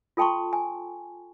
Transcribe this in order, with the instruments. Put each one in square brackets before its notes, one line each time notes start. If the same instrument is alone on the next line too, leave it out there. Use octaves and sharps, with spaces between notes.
[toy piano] F4 A4 G5 A5 C6 C#6
G#5